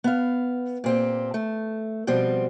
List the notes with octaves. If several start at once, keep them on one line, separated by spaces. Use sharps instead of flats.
B3 F5
A#2 C4 G4
A3
B2 F3 G3 C4